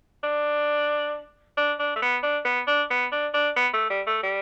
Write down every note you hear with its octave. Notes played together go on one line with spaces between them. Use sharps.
D4
D4
D4
A3
B3
D4
B3
D4
B3
D4
D4
B3
A3
G3
A3
G3